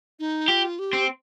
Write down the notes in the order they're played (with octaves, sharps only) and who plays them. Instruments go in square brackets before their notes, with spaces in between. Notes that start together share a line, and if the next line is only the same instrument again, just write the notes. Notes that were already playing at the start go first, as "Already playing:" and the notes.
[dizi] D#4
[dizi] F4 [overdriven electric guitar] G4
[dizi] G4
[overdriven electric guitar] C4